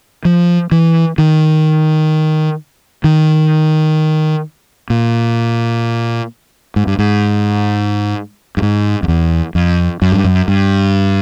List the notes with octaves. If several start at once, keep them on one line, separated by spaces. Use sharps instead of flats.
F3
E3
D#3
D#3
A#2
G#2
G2
G#2
G2
G#2
F2
E2
F2
F#2
G2
F#2
G2